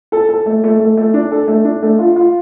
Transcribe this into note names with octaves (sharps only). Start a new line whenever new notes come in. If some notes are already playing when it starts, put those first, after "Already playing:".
A4
A4
A3
A3
A3
A3
D4
A4
A3
D4
A3
F4
F4